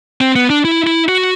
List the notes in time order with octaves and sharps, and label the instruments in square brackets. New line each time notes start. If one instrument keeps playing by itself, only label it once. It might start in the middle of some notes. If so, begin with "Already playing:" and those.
[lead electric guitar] C4
B3
D4
E4
E4
F#4